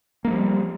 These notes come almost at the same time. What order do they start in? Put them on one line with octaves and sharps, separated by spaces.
A#3 G#3 F3 G3